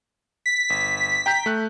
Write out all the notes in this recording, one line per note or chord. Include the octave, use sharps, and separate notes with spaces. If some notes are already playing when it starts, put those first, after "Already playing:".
B6
G1
G5 A#5 G6
A3 F#6